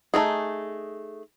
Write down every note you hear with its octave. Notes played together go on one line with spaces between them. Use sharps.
A3 D#4 G#4